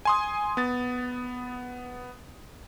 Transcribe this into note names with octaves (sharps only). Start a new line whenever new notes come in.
G#5 C6 D#6
B3 A6